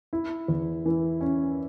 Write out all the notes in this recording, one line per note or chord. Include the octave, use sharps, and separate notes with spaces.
E4
E2
E3
C#4